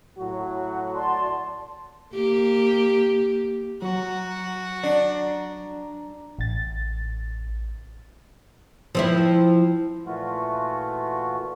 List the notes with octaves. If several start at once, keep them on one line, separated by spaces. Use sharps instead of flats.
A2 F#3 F#4
D5 A5 C6
A#3 G4
F#3 F#4 A#5
D4
A1 A6
F3 C4 E4
A#2 E3 A3 F4 F#4